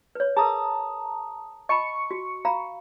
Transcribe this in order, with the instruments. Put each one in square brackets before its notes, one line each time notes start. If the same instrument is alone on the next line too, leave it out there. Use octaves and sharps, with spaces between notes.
[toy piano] B4 C#5
[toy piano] G#4 A#4 [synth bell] A5 A#5 D#6
[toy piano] D#5 A5 B5 [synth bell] C#6 C#7
[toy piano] F#4
F5 A#5 B5